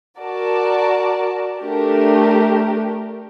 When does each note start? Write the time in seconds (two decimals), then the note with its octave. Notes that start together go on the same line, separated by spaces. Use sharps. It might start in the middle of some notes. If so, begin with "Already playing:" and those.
0.19 F#4 A#4 D5 A5
1.60 A3 D4 G4 A#4